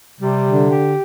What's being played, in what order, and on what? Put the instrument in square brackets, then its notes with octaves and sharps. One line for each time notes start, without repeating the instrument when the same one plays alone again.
[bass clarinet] C3 [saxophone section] G3
[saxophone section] D3
G4